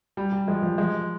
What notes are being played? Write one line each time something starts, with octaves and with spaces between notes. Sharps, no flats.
G3
G3
F3 G#3
F3 G#3
F3 G#3